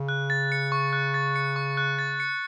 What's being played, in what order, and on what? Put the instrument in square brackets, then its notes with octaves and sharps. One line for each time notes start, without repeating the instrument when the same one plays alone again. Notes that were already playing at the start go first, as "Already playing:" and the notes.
Already playing: [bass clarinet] C#3
[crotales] F#6
A6
C#7
C#6
F#6
A6
C#7
C#6
F#6
A6
C#7